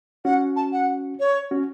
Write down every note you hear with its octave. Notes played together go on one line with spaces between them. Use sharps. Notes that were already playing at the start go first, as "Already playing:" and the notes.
C#4 F#4 F#5
A5
F#5
C#5
C#4 F#4